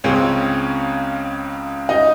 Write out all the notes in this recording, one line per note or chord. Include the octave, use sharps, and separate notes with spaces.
C#2 C#3 G#3 C4 C#4 C#5
D#4 D#5